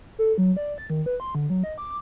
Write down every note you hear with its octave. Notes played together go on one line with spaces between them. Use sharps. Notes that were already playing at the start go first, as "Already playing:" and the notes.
A4
F#3
D5
A6
D#3
B4
C6
D3
F#3
D#5
D6